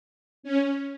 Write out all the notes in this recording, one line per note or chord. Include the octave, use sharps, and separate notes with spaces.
C#4